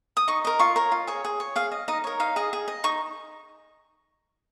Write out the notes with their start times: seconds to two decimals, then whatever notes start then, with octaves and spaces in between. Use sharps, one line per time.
0.17 D#6
0.28 D#4 C#6
0.45 A#4 D#5
0.59 F4 C#6
0.76 A#4 C#5
0.92 F4
1.07 G#4 C#5
1.24 G#4
1.40 C#5
1.56 G#4 F5
1.71 D#5
1.88 D#4 D#5
2.04 A#4 C#5
2.20 D#4 F5
2.36 G#4 D#5
2.53 G#4
2.68 D#5
2.84 D#4 C#6